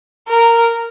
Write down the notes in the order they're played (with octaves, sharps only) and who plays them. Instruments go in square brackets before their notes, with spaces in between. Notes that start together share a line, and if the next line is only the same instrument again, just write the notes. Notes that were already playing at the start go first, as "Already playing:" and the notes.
[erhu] A#4